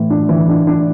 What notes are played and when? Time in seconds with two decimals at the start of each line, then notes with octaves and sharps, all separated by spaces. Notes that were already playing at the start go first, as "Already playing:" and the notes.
Already playing: A2 E3
0.10 D4
0.29 E3
0.49 D4
0.67 D4